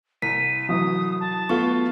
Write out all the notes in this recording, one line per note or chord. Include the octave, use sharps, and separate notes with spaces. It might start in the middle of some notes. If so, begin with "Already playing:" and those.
C2 B6 D#7
E3 F#3 D#6
A5
A3 B3 F4 C#6